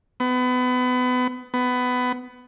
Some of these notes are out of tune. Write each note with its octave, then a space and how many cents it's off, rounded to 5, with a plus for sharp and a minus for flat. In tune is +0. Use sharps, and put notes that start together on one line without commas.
B3 +25
B3 +15